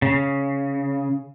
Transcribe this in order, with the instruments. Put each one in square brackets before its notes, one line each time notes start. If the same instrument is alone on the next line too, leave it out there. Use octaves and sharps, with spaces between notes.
[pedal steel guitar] C#3